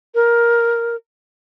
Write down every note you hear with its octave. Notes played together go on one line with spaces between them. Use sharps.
A#4